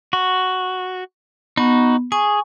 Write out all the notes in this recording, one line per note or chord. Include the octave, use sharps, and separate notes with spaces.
F#4
B3 D#4 F#4
G#4 G#5 C#6